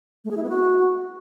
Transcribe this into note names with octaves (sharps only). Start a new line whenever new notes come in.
A3
G#4
E4
B3
F#4